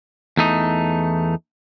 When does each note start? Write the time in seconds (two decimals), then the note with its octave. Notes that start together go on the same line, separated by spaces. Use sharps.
0.37 E2 A3 D#4